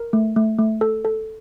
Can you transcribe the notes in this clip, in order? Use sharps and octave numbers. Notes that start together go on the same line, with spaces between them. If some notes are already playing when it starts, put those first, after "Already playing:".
Already playing: A#4
A3
A3
A3
A4
A4